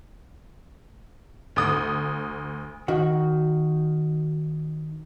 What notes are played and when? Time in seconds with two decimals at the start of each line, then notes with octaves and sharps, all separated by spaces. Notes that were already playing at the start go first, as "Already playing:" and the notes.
1.56 D2 D#6
2.88 D#3 F#4